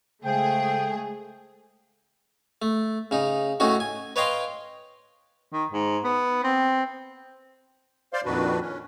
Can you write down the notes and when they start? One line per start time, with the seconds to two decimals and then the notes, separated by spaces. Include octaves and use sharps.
0.25 C#3 G#3 A3 G#4 C5 G5
2.62 A3
3.11 C#3 D#4
3.60 A2 A3 C#4 D#4 F#4
3.80 G#5
4.16 B4 C#5 D#5 F5 G5 C6
5.53 D#3
5.72 G#2
6.04 B3
6.44 C4
8.13 C5 D5 F5 C6
8.25 F2 A#2 D#3 D4 F#4 B4
8.61 C#4